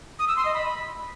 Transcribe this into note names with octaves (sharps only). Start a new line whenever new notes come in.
D#6
E6
C6
D#5
B5